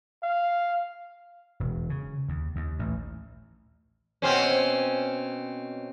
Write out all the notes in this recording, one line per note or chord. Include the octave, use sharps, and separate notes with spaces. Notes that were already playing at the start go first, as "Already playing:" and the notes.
F5
E1
C#3
D#2
D#2
A1
B2 C4 C#4